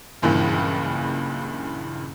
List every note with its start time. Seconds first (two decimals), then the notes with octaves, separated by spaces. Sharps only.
0.22 F#1 C#2 G2 A#2 E3